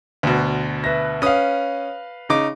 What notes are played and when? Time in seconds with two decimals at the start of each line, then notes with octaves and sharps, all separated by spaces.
0.23 D2 B2
0.84 B4 E5 A#6
1.22 C#4 B4 F5 D#6
2.29 C#3 D#4 D6